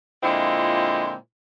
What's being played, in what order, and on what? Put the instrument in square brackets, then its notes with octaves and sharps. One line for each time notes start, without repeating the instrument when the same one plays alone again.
[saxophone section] A#2 D3 G#3 C4 E4 F4